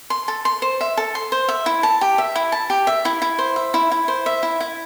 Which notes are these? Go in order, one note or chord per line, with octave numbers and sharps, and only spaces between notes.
C6
A4
C6
C5
E5
A4
C6
C5
E5
E4
A5
G4
E5
E4
A5
G4
E5
E4
E4
C5
E5
E4
E4
C5
E5
E4
E4